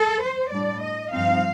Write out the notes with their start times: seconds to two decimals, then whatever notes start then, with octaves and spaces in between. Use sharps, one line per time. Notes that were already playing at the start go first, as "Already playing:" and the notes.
Already playing: A4
0.22 C5
0.51 A2 G3 D4 D5
0.81 D#5
1.11 G2 F3 C4 D#4 F5